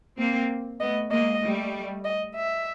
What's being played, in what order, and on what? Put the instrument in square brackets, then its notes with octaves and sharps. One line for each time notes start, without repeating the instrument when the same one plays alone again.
[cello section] A#3 C4
[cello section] A3 B3 [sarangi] D#5
[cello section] G#3 A#3 [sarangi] D#5
[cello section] G3 A3
[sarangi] D#5
E5